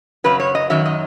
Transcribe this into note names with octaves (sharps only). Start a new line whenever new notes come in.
F#2 C#3 F#3 B4
C#5
D#5
F#2 D#3 F#3 E5
D#5